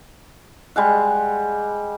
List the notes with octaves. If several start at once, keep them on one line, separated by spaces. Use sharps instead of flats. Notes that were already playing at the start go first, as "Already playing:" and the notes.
G3 G#3 F#5